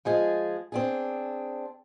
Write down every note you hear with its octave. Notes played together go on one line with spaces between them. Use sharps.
F3 G#3 G#4
C4 D4 G#4